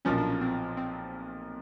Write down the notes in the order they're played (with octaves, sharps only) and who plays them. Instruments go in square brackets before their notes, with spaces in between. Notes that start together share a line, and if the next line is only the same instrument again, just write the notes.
[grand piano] B1 A#2 F3 A#3 [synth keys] C#4
[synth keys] D4
C#4
C4
C4